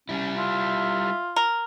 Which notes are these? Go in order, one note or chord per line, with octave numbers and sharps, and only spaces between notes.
G3 C#4 E4
F4 E5
A#4